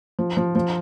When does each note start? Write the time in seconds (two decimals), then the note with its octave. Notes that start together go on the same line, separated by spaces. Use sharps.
0.19 F3
0.37 F3
0.55 F3